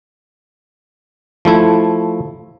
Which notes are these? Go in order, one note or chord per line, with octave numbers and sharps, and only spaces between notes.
F3 A3 E4